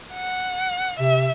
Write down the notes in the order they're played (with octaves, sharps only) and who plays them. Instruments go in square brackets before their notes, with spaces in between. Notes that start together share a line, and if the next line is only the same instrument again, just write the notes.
[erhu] F#5
[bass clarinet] C3 [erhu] E5